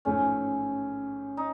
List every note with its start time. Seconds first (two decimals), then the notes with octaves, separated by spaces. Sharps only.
0.05 A1 G#2 F3 A3 C#4
1.37 D#4